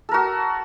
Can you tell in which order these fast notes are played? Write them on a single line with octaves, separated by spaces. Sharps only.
A4 A#4 F#4